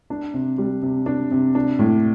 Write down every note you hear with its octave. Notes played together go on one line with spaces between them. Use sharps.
D4
C3
G3
C3
D4
C3
D4
A2